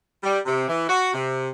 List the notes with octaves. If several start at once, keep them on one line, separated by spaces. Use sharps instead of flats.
G3
C3
E3
F#4
C3